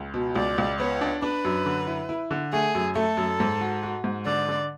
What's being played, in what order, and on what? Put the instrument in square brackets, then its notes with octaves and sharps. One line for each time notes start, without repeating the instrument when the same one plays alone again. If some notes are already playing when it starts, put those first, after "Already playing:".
Already playing: [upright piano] C#2
B2
[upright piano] C#2 [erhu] D5
[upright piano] C#2
[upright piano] B3 [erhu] C#5
[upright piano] D4
[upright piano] D4 [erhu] B4
[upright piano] F#2
D3
E4
E4
D3
[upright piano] A3 [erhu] G#4
[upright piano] F#2
[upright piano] A3 [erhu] A4
[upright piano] F#2
G#2
F#4
F#4
G#2
[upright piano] D3 [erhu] D5
[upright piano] D3